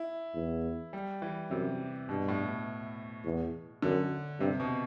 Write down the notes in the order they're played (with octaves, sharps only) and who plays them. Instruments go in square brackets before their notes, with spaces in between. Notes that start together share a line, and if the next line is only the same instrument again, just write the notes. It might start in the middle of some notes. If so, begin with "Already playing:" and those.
Already playing: [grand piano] E4
[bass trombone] E2
[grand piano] G3
E3
[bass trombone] F#2 [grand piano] C3
[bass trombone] G2 [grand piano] B2
[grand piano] A2
[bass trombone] E2
[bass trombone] F#2 [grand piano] D3
[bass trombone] G2 [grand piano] C3
[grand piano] B2